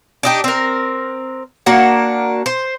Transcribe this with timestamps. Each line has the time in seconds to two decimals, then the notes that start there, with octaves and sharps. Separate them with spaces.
0.23 D4 D#4 G4
0.44 C4 A#4
1.66 A#3 D4 F#4 F#5
2.46 C5